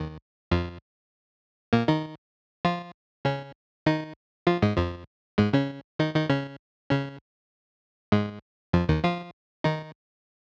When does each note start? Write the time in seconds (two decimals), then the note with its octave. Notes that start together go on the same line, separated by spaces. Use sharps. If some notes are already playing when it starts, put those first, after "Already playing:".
Already playing: D#2 D#3
0.51 F2 F3
1.73 A#2 A#3
1.88 D#3 D#4
2.65 F3 F4
3.25 C#3 C#4
3.86 D#3 D#4
4.47 F3 F4
4.62 G#2 G#3
4.77 F2 F3
5.38 G#2 G#3
5.53 C#3 C#4
5.99 D#3 D#4
6.15 D#3 D#4
6.30 C#3 C#4
6.90 C#3 C#4
8.12 G#2 G#3
8.73 F2 F3
8.89 D#2 D#3
9.04 F3 F4
9.64 D#3 D#4